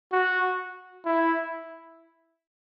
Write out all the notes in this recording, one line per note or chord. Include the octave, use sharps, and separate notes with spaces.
F#4
E4